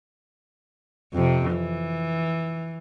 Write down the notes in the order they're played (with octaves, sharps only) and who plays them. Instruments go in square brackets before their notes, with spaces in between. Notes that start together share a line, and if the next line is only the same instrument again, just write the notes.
[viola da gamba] F2 C3
E3